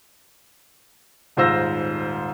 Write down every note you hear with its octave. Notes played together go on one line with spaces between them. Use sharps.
D#1 G#2 F4 C5 E6 A#6